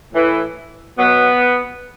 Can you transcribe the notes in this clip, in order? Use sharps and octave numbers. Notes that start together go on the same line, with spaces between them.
A2 E3
B2 F#3 B3